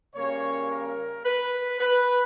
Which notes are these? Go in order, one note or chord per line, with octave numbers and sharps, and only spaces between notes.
C#3 G3 A#3 C#4 C#5
A#4
B4
B4